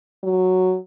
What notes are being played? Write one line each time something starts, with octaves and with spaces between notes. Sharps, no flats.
F#3